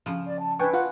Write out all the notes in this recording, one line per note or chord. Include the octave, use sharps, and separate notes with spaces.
C#3 F3
D5
A5
D4 E4 B4 G5 G#5 C#6
F4 F#5